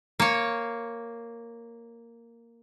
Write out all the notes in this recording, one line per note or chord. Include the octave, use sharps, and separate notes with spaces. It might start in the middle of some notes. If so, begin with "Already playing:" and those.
A#3 C#5